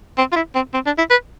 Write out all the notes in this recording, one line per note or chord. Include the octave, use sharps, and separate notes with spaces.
C4
F4
E4
C4
C4
D4
E4
B4